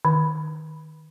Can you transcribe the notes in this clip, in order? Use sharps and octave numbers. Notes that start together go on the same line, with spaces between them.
D#3